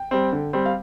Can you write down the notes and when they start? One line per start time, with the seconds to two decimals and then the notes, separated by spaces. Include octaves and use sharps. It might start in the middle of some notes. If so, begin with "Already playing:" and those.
Already playing: G5
0.11 G3 C4
0.32 D3
0.53 G3 C4
0.66 F5